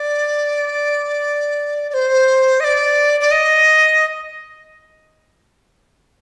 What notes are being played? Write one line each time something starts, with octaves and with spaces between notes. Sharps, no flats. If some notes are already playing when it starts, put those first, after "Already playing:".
Already playing: D5
D5
C5
D#5
D5
D5
D#5